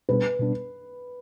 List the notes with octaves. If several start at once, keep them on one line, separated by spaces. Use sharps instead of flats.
B2 G3 B3 D4 B4
B2 G3 B3 D4